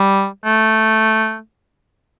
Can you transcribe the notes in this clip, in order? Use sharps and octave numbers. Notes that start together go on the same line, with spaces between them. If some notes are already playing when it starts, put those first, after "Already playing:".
Already playing: G3
A3